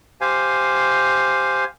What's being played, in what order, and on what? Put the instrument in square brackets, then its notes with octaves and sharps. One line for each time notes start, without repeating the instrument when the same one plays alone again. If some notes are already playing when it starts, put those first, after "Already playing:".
[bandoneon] G4 C5 F5 G#5